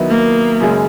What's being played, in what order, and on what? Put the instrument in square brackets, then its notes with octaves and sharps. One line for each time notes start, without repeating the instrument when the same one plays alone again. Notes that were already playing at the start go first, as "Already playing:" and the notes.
Already playing: [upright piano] D#3 F#3 B3 E4
[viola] A#3
[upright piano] F#2 C#3 G#3